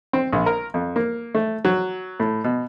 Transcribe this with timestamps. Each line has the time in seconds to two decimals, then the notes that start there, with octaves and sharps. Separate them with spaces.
0.13 C4
0.32 A#1
0.46 A#4
0.74 F2
0.96 A#3
1.35 A3
1.65 F#3
2.20 A2
2.44 B2